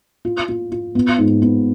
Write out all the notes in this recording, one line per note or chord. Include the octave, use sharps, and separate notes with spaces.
F4
F4
F4
B3
G#2
B3